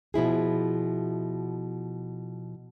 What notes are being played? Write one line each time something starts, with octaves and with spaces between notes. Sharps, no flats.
B2 F3 E4 G#4